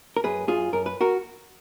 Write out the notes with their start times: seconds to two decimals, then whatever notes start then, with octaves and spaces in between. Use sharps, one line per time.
0.17 A#4
0.24 F#2 G#4 B4
0.48 F#2 F4 G#4
0.72 F#2 A#4
0.86 B4
1.01 F#4 A#4